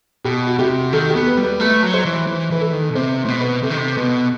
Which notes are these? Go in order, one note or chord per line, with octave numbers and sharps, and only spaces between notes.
B2 G4
F#4
C3 G4
D#3 A4
G4
B3
B4
G3
B4
A3 B4
F#3
C5
E3
E3
E3 B4
A4
D#3
B2
C3 C5
A2
B2
B4
C3 A4
D#3
C3
B2 B4